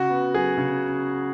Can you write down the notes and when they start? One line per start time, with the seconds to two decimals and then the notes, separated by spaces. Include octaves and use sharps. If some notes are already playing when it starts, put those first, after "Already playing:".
Already playing: C#3 F#4
0.10 B3
0.35 F#3 G#4
0.58 C#3